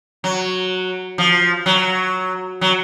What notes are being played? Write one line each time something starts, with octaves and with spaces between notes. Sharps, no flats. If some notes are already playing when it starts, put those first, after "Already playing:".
F#3
F3
F#3
F#3